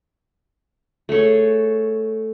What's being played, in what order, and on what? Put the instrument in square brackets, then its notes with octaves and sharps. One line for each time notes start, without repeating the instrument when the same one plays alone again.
[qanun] A3 G#4 A4 C#5